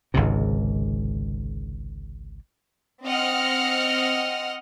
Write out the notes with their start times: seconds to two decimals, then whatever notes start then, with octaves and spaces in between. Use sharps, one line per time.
0.14 G#1 C#2 G#2 C3
3.04 C4 D#5 F#5 F6